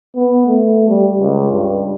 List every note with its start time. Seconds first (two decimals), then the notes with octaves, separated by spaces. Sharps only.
0.16 B3
0.48 A3
0.89 G3
1.19 C#2
1.52 G2